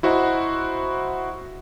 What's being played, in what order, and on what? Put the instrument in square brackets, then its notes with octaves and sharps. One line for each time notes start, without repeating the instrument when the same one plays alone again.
[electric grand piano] E4 F#4 C5 D#5 F#5 A#5